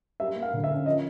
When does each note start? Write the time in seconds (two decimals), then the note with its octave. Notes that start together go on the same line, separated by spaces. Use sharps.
0.20 G3 E5
0.36 A#3
0.42 F5
0.53 D3
0.64 E5
0.69 C#4
0.86 F3 D#5